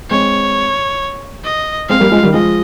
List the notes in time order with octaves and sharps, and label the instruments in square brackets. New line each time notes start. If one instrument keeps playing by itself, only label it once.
[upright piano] G#3 C4 [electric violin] C#5
[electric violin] D#5
[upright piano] G#3 C4 [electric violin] F5
[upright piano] G3 A#3
F3 G#3
D#3 G3
[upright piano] F3 G#3 [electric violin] D#5